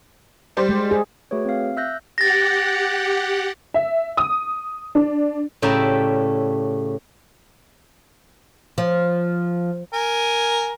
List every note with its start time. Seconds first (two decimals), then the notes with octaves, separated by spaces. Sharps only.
0.57 G3 C5 D5
0.69 G#3
0.91 G#4
1.31 A3 F#4 G#4 B4 C#5
1.45 C4 F5
1.77 E5 E6 F#6 G6 A#6
2.18 G4 F#5 A6 A#6
3.74 E5
4.17 D#6
4.95 D4
5.62 A2 C#3 G4 D5 E5 A#5
8.78 F3
9.93 A#4 G#5